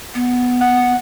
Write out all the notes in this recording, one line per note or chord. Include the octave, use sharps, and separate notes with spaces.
B3
F#5